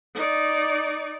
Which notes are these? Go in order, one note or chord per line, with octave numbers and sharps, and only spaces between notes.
D#4 D5